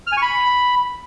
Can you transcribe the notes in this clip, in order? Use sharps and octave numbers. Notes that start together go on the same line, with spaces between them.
F6
G#5
C#6
B5